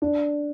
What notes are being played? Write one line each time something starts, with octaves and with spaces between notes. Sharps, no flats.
D4